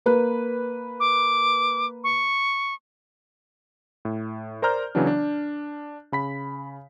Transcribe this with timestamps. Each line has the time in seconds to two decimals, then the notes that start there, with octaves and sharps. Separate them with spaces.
0.06 A#3 B4
1.00 D6
2.04 C#6
4.05 A2
4.62 A#4 C5 D5 A#5 F6 G6
4.95 C#3 E3 F#3 B3 D4
5.07 D4
6.12 C#3 B5 B6